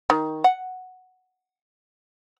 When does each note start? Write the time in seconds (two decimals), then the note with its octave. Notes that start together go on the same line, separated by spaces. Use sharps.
0.10 D#3
0.44 F#5